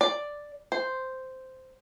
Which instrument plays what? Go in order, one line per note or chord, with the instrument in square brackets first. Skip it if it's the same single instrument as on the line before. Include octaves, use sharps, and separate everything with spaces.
[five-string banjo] D5
C5